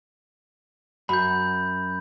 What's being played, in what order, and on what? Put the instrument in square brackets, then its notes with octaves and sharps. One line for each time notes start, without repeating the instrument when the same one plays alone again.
[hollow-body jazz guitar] F#2 [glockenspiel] B5 G6